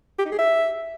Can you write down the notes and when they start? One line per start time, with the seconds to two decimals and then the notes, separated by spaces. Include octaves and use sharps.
0.19 G4
0.25 D#4
0.32 G#4
0.39 E5